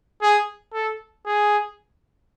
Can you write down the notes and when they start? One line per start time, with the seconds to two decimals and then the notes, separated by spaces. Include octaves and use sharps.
0.21 G#4
0.73 A4
1.26 G#4